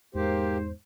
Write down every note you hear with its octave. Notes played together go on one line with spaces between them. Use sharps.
E2 G#2 A#3 G4 C5